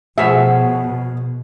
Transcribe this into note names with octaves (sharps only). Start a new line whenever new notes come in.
B2 F3 F#4 G#4 C#5 E5